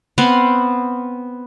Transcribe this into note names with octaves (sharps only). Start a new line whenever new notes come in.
B3 C4 F5 F#5